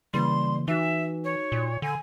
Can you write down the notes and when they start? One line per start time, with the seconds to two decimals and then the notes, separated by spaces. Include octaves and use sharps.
0.14 C#3 E3 G3 A#3 C6
0.68 E3 D#4 F#4 E5
1.24 C#5
1.52 A#2
1.82 D3 G#5